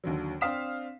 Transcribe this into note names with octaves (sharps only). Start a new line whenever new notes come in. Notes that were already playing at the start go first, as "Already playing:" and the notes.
D#2 D3 F#3
C4 D4 F5 D#6 B6 E7